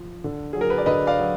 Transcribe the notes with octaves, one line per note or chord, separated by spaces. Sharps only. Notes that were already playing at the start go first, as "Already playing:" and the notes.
Already playing: F3
D3
F#3 G#4
A#4
B4
D5
D3 B4 D#5
D5 F5
F#3